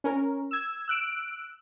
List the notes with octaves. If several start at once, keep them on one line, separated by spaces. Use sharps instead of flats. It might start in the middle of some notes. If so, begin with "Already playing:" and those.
C#4 A#4
E6 G#6
E6 F#6 D7